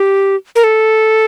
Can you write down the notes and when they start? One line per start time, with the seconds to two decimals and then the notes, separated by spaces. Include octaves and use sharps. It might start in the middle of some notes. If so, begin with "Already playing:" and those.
Already playing: G4
0.56 A#4
0.64 A4